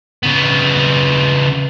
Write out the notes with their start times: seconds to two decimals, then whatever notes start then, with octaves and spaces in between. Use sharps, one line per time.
0.23 C#3 B3